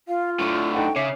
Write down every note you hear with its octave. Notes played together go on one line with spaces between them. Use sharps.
F4 F5
A2 D3 C#6
D#4 A4 F#5 G5
C#3 C#5 E5 D6 C7